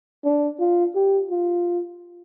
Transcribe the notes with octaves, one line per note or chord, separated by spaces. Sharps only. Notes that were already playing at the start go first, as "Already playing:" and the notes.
D4
F4
G4
F4